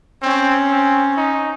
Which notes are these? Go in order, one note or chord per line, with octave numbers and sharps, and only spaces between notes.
C4 C#4
C4
D#4